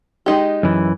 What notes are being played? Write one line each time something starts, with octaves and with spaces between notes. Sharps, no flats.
G#3 D#4 G4
F#2 E3